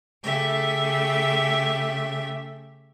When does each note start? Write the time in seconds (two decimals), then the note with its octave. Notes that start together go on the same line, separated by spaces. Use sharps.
0.23 C#3 A3 G4 E5